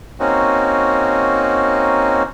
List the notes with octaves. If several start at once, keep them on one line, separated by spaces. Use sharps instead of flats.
A#3 C4 C#4 D#4 F#4